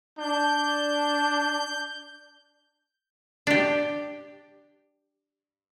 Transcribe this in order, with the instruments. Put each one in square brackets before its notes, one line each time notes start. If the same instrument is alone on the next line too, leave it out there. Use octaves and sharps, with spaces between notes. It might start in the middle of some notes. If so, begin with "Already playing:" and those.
[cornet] D4 [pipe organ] G6
[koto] D4 G4